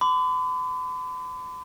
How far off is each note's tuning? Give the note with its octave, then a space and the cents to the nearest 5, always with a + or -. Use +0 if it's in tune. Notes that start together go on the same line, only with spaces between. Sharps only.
B5 +45 D6 +5